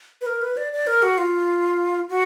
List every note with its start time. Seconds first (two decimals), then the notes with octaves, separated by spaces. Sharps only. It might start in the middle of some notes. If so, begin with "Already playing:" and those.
0.21 B4
0.26 A#4
0.42 B4
0.57 D5
0.72 D5
0.87 A#4
1.02 F#4
1.18 F4
2.09 F#4